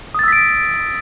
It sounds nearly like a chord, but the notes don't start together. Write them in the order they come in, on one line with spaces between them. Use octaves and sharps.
D#6 A6 E6 B6 D7